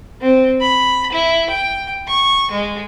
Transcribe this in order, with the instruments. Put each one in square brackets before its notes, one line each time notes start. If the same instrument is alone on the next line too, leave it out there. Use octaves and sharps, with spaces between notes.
[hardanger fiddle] C4
B5
E4
G5
C#6
G#3